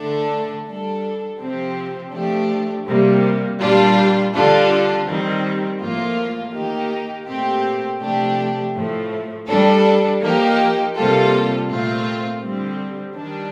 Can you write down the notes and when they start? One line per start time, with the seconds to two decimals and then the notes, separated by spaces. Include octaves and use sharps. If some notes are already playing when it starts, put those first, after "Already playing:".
Already playing: D3 A3 D4 A4
0.67 G3 D4 A4
1.40 C3 F3 C4 G4
2.13 F3 A3 D4 G4
2.87 C3 G3 A#3
3.60 A#2 G3 D4 F4
4.34 D3 G3 D4 F4 A4
5.07 D#3 G3 C4
5.81 A2 F3 A#3 F4
6.54 D#3 A#3 D#4 G4
7.27 A#2 A3 C4 G4
8.01 C3 F3 A3 D4 G4
8.74 A2 F3 A3
9.48 G3 D4 A4
10.21 F3 A#3 D#4 G4
10.95 C3 G3 A#3 F4 A4
11.68 A#2 A3 C4 F4
12.42 D3 G3 C4
13.15 D#3 G3 D4